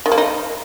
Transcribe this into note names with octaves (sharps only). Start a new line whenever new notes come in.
D#3
A#3
D#4